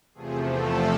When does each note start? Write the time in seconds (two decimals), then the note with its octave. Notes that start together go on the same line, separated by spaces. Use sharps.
0.14 E2 C3 F3 A3 G#4
0.46 A4